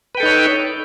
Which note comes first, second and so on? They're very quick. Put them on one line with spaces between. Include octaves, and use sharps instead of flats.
B4 G5 A4 D#4 C#5